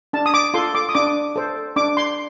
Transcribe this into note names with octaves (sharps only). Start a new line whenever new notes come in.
D4 A5
D#6
D6
F4 A4 C6
D6
D#6
D4 D6
A4 C5
D4 D6
C6